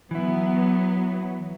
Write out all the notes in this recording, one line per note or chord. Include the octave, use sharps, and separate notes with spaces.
E3 F#3 B3 E4